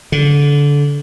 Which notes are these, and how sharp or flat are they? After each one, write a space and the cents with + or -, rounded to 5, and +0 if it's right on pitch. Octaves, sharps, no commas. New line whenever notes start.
D3 -25